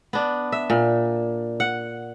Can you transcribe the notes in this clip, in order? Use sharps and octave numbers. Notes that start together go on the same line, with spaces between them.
B3 D4
E5
A#2
F#5